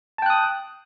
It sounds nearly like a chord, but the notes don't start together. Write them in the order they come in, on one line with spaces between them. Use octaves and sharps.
A5 G5 F#6 D#6